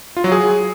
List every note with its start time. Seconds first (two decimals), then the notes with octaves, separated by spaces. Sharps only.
0.17 F4
0.24 F#3
0.32 G#4